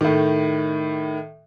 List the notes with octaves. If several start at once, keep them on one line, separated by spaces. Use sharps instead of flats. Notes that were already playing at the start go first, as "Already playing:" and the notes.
A2 D#3